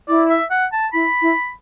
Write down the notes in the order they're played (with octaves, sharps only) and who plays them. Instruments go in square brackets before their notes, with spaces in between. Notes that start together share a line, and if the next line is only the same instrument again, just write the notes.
[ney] E4 [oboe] D5
[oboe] E5
F#5
A5
[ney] E4 [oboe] B5
[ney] E4